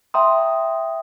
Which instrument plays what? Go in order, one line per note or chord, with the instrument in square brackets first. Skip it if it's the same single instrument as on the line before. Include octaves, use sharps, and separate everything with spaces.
[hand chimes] E5 G5 D#6 [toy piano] A#5 C6